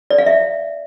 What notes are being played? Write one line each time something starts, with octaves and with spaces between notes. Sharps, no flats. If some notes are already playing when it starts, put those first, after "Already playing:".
D5
F5
E5